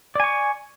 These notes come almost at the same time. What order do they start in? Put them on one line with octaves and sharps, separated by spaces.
D5 G#5 C#6